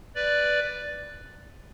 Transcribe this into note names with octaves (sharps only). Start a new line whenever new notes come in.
B4 D5